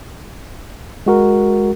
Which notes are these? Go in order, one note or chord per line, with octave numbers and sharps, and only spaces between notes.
G#3 F#4 A#4